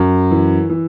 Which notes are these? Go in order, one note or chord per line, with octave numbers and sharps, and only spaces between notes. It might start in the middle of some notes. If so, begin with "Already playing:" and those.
Already playing: F#2
E3
E3